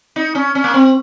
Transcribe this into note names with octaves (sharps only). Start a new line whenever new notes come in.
D#4
C#4
C#4
A#3
C4